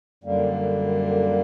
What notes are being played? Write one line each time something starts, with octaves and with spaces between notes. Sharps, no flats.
F#2 D3 G3 A#3